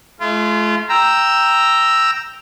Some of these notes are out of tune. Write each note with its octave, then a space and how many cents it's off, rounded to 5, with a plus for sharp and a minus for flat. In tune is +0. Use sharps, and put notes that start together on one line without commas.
A3 -45 F4 -25
G5 +0 A#5 +0 E6 +0